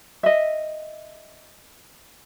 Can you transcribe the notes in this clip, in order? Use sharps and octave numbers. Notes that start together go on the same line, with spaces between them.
D#5 E5